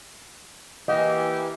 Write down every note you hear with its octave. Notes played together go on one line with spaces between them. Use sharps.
E3 A#3 G4 D#5 F#5